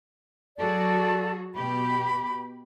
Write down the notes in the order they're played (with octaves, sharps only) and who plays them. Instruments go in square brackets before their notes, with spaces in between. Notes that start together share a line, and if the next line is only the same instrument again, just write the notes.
[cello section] F#3 F#4 G#4 [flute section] A4 D5 A5
[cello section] B2 G4 [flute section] B5